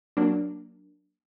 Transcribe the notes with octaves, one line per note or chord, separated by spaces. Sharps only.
F#3 A#3 D4